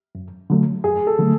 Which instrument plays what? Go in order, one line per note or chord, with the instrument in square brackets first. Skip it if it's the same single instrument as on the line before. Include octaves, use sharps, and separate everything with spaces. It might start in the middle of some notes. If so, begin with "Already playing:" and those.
[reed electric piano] F#2
D3 F#3 A3
[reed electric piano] F#2 [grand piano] G#4
[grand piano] A4
[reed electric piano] D3 F#3 A3